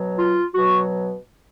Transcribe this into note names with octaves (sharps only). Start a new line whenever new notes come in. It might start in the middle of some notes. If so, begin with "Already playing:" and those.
Already playing: B2 F#3
F4
B2 F#3 F#4